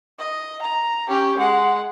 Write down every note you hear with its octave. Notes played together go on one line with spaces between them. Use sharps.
D#5
A#5
C#4 G4
G#3 F#5